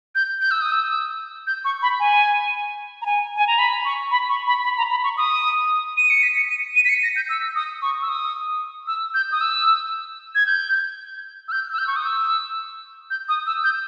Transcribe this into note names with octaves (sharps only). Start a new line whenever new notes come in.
G6
G6
E6
D#6
E6
G6
C#6
B5
G#5
A#5
G#5
G#5
A#5
B5
C#6
B5
C#6
B5
B5
A#5
B5
C#6
D#6
D#7
C#7
B6
C#7
D#7
D#7
B6
C#7
A#6
G6
E6
D#6
C#6
E6
D#6
E6
G6
D#6
E6
G#6
G6
E6
G6
E6
G6
C#6
D#6
E6
G6
D#6
E6
G6